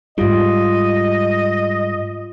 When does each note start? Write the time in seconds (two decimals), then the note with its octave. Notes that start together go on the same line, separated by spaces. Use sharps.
0.18 G#2 G3 F4 D#5